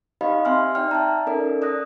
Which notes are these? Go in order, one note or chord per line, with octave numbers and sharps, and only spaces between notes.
D#4 G4 C5 D#5 F5 B5
C4 E5 G#5 C6 F6
D#4 D5 G5 F6
E5 A5 A#5
C#4 D#4 A4 A#4 D5
D5 D#6 F#6 A#6